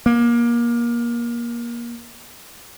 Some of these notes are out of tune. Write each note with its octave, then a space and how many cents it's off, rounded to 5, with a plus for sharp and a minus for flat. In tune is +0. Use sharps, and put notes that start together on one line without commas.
A#3 +25